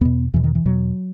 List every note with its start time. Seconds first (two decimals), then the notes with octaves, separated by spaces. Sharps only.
0.01 E2 B2 B3
0.34 E2 B2 E3
0.44 D#3
0.55 E3
0.65 E2 B2 F#3